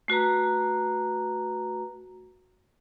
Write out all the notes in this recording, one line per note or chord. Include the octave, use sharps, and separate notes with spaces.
A3 F#4 B4 A#5